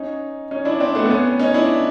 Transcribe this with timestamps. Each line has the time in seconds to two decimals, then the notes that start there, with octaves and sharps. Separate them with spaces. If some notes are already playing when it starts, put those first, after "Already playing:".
Already playing: C#4 D#4
0.51 C#4 D#4
0.65 D4 E4
0.80 C4 D4
0.95 A3 B3
1.05 C4
1.10 B3 C#4
1.39 C#4 D#4
1.54 D4 E4